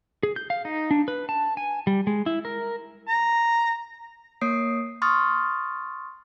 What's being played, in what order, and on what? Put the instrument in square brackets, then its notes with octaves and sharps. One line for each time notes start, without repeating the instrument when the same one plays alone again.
[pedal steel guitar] G#4
G6
F5
D#4
D4
B4
A5
G#5
G3
G#3
E4
A#4
[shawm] A#5
[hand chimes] A#3 C#5 D#6 C7 D7
C6 C#6 D#6 F6 A6